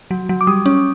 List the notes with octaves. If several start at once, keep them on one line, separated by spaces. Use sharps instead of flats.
F#3
F#3
D6
G3 D#6
C#4